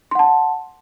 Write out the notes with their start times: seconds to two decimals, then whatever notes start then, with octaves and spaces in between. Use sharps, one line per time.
0.11 C6
0.15 F#5
0.19 A5